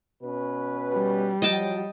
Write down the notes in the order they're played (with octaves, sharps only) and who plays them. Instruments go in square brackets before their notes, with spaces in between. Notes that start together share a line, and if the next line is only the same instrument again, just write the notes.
[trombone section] B2 C#4 B4
[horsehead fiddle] G3
[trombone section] F3 F#3 [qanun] D#5 G5 A5